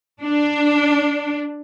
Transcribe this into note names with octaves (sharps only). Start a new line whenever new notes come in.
D4